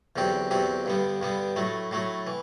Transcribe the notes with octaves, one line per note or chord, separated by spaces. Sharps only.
E2 D3 F#3 C4 G4
E2 D3 F#3 C4 G4
G2 D3 G3 B3
G2 D3 G3 B3
A2 F#3 A3
A2 F#3 A3
E3